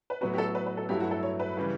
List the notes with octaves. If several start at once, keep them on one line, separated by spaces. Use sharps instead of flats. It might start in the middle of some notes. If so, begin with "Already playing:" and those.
B4
A2 F#3 B3 F#4 B4
G4
A4
B4
B4
A4
G2 F#3 A3 E4 G4
F#4
A4
C#5
B4
C#3 E3 G3